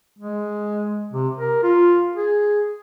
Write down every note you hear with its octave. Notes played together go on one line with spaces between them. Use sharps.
G#3
C3
A#4
F4
G#4